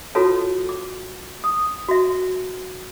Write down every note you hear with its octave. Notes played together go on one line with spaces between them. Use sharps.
F4 F#4 A4 B4 C#5 A5
D6
D#6
F#4 E5